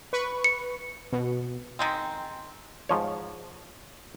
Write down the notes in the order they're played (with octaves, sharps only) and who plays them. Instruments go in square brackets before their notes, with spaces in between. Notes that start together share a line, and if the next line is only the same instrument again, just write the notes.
[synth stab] B4 C#6
[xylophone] C#7
[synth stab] B2
[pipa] D#3 G#3 C4
[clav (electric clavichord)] G#2 F3 C#5